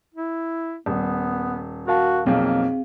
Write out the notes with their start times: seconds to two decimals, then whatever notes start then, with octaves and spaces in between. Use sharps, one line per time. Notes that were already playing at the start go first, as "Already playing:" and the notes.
0.15 E4
0.86 D#1 B3
1.88 F#4 A#4 F5 A5
2.26 B1 F2 A#3 C4 G#4 F5